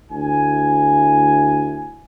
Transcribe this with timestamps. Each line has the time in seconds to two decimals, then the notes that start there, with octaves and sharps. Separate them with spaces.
0.10 D2 E4 G#5